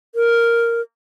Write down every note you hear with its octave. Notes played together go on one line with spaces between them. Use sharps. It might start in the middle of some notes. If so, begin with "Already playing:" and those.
A#4